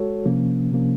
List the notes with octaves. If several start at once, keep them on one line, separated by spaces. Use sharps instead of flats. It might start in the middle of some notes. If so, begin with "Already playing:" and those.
Already playing: G#3 F#4 A4 C#5
C3 F3 A#3 C#4
C3 F3 A#3 C#4